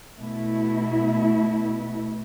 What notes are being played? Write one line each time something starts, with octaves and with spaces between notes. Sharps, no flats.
B2 A3 E4